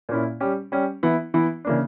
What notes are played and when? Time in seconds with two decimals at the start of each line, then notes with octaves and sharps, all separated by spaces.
0.09 A#2 A#3 C#4 E4
0.40 G3 C#4 G4
0.72 G3 C#4 G4
1.03 E3 B3 E4
1.34 E3 B3 E4
1.65 C#3 E3 A#3 D4